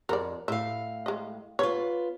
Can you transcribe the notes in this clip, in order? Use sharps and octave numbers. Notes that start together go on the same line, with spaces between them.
F2 A#4 D5
A2 E5 F5
G#3 D#5
B3 F4 C#5